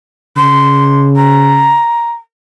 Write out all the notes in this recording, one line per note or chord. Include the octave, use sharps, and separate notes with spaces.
C#3 C6
A#5